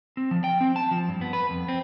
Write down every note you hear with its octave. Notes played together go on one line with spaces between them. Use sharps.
C4
F3
G5
C4
A5
F3
G2
B3
B4
F2
C4